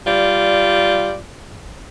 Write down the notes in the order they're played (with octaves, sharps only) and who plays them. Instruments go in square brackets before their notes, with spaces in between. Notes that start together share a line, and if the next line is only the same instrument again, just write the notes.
[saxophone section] G3 F4 D5